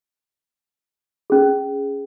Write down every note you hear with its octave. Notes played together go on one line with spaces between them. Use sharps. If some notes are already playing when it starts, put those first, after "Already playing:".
C#4 G#4